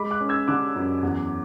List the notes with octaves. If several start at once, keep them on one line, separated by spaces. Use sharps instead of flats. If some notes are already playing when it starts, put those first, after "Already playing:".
Already playing: G#3 B5 D6
D6 F#6
C#4
E6 G#6
D3 D6 F#6
F#2
E2